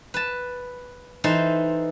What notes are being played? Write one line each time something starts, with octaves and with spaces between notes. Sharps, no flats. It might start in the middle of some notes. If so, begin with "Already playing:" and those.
B4 A5
E3 D#4 A4 C5